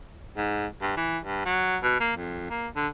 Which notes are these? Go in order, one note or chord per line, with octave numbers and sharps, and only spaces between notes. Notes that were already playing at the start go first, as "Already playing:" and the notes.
G#2
G2
E3
G2
F#3
B2
A#3
F2
A#3
D3